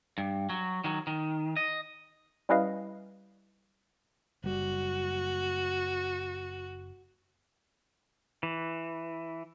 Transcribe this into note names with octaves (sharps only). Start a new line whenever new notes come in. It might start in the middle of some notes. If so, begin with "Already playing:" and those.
G2
F#3
D#3 F#3
D#3
D#5
G3 C#4 E4 B4 D#5 F5
F#1 G3 F#4
E3